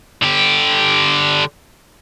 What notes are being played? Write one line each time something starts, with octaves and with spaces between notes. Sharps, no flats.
D3 G4